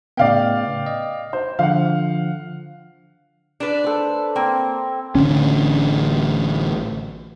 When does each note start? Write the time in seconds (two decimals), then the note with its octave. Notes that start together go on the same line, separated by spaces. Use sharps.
0.17 A2 C#3 B3 D5 F5 G5
0.86 D#5
1.33 C5
1.59 D3 F3 F5 F#5
3.60 D4 B4
3.84 A4 C5
4.36 A#3 C4
5.15 A1 D3 C#4